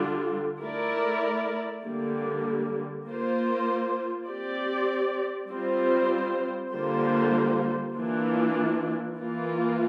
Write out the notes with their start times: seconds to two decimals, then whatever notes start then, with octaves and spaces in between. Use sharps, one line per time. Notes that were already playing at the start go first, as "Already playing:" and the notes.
Already playing: D3 G3 D4 F4
0.62 A3 E4 A#4 D5
1.83 D3 G3 A#3
3.06 A#3 F4 C5
4.28 C4 G4 D5
5.49 G3 C4 F4 C5
6.72 D3 G3 A#3 F4 C5
7.94 E3 A#3 D4 F4
9.16 E3 A#3 F4